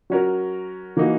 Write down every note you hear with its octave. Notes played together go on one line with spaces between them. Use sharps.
F#3 C#4 F#4 A#4
E3 A#3 D#4 F#4